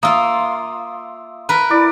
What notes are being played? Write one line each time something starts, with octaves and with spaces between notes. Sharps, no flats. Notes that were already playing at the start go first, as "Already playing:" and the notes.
A#3 F4 E5 D#6
A#4 B4
E4 D5